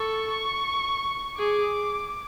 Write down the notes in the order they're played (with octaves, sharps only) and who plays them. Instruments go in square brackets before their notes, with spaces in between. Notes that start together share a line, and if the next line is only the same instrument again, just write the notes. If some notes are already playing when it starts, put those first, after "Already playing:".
Already playing: [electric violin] A4 [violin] C#6
[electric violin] G#4 [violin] D6